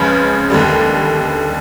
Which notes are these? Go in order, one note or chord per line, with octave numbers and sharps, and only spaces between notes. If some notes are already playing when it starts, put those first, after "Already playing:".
Already playing: C#2 C#3 F3 G#3 B4
D#2 D3 G3